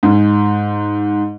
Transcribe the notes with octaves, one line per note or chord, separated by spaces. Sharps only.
G#2